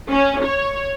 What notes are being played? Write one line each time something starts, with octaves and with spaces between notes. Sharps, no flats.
C#4
C#5